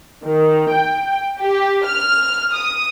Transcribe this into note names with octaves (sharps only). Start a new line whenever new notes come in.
D#3
G5
G4
F6
D#6